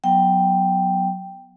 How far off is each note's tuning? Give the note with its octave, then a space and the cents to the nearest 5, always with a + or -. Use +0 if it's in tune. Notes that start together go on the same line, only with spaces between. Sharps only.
F#3 +0 B3 +0 G5 +0